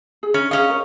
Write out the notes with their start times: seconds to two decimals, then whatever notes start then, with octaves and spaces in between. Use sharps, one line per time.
0.23 G#4
0.34 C#4
0.51 C#4 G#4 C#5 D#5 F5
0.70 A#4 C#5